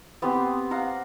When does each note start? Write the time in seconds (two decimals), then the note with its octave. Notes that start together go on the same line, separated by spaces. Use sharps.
0.22 B3 C4 G4 C5
0.71 F5 F#5 A#5